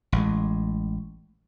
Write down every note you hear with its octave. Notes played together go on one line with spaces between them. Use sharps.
A1 G#3